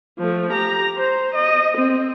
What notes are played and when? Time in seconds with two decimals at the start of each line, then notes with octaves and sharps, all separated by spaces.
0.19 F3 A3
0.52 G4 A#5
0.97 C5
1.35 D#5
1.77 C4